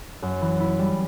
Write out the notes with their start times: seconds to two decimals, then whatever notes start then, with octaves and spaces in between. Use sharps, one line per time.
0.22 F#2
0.41 E3
0.60 E4
0.79 G3